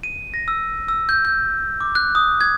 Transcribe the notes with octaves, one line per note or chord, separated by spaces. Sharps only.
D#7
A#6
E6
E6
G6
G6
D6
F#6
D#6
G#6